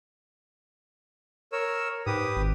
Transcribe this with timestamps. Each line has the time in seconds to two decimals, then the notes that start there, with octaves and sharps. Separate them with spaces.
1.52 A#4 C#5 E6
2.06 G#2 G4 B4 D#6
2.36 G#1